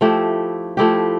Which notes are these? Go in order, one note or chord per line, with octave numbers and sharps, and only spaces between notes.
F3 A3 E4 G4
F3 A3 E4 G4